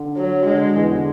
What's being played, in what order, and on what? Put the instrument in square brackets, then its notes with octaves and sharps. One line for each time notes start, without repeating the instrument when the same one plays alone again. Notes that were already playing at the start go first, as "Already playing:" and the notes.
Already playing: [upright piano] D3
[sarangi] F#3
[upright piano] D3 [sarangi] G#3
[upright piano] E2 E3
D3